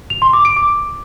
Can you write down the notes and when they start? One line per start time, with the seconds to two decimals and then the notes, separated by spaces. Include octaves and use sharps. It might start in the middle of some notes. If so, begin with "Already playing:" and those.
0.10 F7
0.22 C6
0.33 D6
0.45 D7
0.56 D6